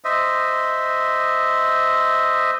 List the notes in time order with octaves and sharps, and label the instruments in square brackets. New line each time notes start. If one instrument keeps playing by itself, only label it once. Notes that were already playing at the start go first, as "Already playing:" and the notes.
[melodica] C5 D#5 E5